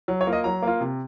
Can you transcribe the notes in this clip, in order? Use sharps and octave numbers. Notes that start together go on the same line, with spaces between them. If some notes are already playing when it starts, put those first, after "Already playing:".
F#3
C#5
A#3 F4
D#5
F#3 A#5
A#3 F4
C3